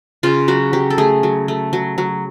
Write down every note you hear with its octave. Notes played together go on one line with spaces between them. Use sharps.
C#3 F4
F#3 F#4
F#3 G4
A4
A3 G#4
F#3
A3
F#3
F#3